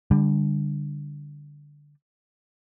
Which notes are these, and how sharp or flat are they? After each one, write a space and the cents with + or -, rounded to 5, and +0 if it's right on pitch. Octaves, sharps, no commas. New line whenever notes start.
D3 +0 G3 +30